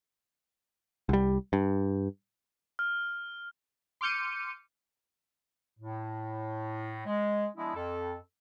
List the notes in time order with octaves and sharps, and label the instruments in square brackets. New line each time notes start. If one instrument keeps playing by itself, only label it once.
[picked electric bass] C2 G3
G2
[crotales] F6
[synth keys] C6 D6 F6 G6 C#7 D#7
[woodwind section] A2
G#3
F3 G#3 B3 D4 E4
F2 A4